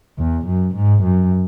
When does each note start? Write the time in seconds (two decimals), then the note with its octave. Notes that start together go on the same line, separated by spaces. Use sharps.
0.18 E2
0.47 F#2
0.75 G#2
1.03 F#2